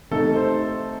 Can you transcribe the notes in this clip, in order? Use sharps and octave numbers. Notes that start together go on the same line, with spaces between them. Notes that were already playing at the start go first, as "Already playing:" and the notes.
C3 D#3 A3 D#4 A4
C5